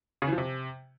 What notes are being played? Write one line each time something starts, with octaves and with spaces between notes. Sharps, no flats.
C#3
E3
F3
C3